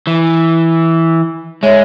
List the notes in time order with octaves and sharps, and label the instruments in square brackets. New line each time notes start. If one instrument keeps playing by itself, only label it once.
[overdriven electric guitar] E3
[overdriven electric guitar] G#3 [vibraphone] C#5 E5